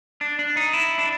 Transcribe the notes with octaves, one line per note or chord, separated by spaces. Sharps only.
D4
D4
D#4
E4
D4